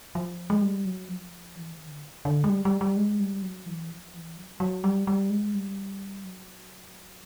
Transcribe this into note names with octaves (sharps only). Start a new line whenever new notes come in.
F3
G#3
G3
F#3
F3
E3
D#3
D3
D3
G#3
G3
G3
G3
G#3
G3
F#3
E3
F3
E3
F#3
F#3
G3
G3
G#3
G3
F#3